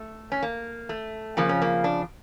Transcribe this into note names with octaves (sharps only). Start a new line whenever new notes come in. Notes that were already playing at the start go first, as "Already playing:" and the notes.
Already playing: A3
C#4
A#3
A3
F2 C#3 F3 A#3
C#4
A#3
D4